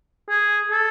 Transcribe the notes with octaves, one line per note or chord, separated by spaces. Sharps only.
G#4
A4